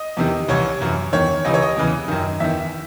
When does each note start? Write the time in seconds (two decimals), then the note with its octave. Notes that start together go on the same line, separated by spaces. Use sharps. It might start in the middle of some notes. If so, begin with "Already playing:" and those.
Already playing: D#5
0.17 E2 C3 D#3
0.48 C2 C3 E3 C#5
0.81 F#2 E3
1.13 E2 D#3 C#5
1.45 C#2 C3 E3 D#5
1.54 C#5
1.62 D#5
1.76 E2 C#3 E3
2.08 F#2 D#3
2.40 E2 D#3 E5